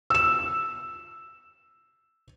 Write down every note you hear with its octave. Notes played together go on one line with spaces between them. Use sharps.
E6 E7